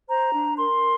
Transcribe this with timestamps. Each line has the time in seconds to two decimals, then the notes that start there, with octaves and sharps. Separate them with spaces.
0.09 C5 A#5
0.34 D4
0.58 A#4 C6